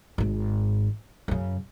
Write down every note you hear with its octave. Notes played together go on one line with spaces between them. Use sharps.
G#1 G#2
F#2 C#3